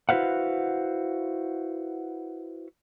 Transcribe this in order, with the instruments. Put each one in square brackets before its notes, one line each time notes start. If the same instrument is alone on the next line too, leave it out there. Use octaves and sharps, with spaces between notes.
[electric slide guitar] E4 F#4 B4 C5 F5 F#5